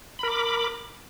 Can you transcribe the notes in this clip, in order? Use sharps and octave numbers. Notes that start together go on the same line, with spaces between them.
A#4 B5 D6